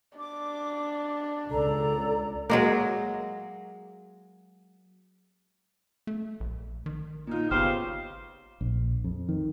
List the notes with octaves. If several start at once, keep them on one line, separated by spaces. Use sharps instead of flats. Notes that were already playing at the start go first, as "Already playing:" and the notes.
D4 D6
C#2 A4 D5 A#5
F#3 G#3 A#3
A3
A#1
D#3
A#2 D#4 F4
G#1 C#3 B3 G4 C5 F5
A#1
F2
D#3